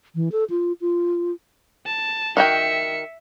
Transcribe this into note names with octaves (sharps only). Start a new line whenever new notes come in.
E3
A4
F4
F4
A5
D#3 F#4 E5 G5 C#7